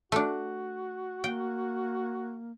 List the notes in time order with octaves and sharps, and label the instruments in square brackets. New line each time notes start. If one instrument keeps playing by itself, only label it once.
[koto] A3 D4 [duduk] F#4
[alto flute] A#3 [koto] G5